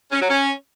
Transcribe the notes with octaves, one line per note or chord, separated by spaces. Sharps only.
C#4
F#3
C#4